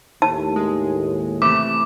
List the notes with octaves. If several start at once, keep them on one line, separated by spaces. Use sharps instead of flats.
D#2 A2 A5
G#3
C3 E3 A3 D6